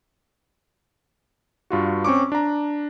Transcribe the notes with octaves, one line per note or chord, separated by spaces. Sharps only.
G2 F4 F#4
C4 C#4 C#6 D6
D4 A#5